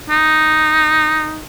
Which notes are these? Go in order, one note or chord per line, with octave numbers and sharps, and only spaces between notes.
D#4